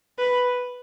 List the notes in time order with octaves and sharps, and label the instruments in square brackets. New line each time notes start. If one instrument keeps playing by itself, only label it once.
[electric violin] B4